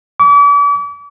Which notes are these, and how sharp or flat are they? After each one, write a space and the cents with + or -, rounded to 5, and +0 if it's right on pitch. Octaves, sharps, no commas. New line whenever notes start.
D6 -40